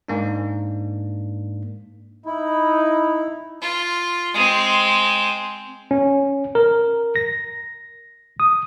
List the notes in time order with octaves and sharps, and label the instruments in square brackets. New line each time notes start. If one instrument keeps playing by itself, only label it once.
[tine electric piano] G#2 A#3 D4
[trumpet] D#4 [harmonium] E4
[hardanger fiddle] F4
G#3 C4
[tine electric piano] C#4
A#4
A#6
D#6